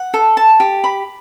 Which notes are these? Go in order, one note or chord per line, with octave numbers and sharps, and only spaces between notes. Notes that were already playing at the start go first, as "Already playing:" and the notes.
Already playing: F#5
A4
A5
G4
B5